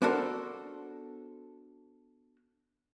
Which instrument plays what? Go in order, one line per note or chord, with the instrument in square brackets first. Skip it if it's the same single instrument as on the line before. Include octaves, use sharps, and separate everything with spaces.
[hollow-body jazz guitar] B3 D4 F#4 A4 A#4 C5